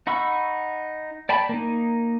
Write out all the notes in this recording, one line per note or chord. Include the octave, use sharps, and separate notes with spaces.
D#4 F#5 B5 C#6 E6
D5 G5 A5 B5
A#3 D#4